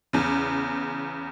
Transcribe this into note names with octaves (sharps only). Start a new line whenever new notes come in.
E2 C#3